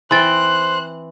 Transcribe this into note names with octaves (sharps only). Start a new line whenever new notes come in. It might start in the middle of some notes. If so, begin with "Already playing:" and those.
E3 C4 C5 G5 C6 F#6 A6